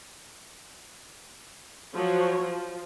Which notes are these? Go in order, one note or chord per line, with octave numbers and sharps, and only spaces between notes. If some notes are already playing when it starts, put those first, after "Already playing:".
F3 F#3 F#4 C#5
F3